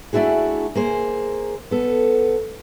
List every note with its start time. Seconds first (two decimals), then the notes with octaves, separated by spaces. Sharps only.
0.13 A3 D4 E4 F#4 G#4
0.75 A#3 G#4 C5
1.71 B3 A4